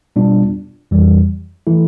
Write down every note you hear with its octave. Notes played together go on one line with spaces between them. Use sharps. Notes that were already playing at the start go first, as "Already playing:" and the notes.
B2 G3 B3 D4 F4
F2 E3 G3
E3 A3 E4 A4